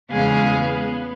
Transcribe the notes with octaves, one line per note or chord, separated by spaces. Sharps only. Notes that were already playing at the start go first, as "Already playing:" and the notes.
E2 C#3 G#3 G#4 F5
B3